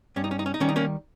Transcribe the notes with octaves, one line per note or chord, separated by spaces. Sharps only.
G2 C#4
D#4
C#4
D#4
C#4
D#4
D#3 G3 C#4
D#4
A#3 C#4